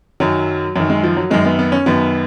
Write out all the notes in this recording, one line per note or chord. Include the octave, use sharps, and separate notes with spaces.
F#2 D#3 F#3
F#2 D#3 F#3
G#3
F3
F#3
F#2 D#3 G#3
B3
B3
C#4
F#2 D#3 B3